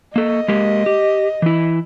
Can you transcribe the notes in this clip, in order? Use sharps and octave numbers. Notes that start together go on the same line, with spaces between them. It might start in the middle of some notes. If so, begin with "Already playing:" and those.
A#3 A4 D#5
G#3 A#3 G4
G4
E3 E4